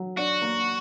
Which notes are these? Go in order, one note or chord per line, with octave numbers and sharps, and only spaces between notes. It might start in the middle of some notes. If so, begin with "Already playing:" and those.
Already playing: F#3
D4 F#4
A#3